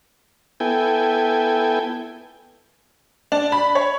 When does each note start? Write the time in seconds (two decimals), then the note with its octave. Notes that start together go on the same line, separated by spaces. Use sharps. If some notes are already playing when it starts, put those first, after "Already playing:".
0.60 B3 E4 A4 G5 G#5
3.32 D4
3.52 B5
3.75 C#5